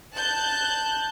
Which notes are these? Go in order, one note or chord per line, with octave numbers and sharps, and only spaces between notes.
A5 F#6 G6